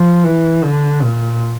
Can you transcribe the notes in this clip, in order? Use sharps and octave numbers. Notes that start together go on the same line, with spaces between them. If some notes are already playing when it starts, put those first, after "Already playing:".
Already playing: F3
E3
D3
A#2